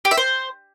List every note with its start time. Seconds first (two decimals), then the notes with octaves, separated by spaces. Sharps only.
0.05 G4
0.11 E5
0.17 C5